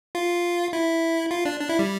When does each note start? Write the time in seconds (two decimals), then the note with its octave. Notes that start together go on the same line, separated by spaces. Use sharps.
0.15 F4
0.73 E4
1.31 F4
1.45 D4
1.60 D4
1.69 E4
1.79 G3